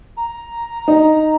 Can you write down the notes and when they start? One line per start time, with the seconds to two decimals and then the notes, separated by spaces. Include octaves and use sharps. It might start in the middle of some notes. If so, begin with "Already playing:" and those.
0.17 A#5
0.88 D#4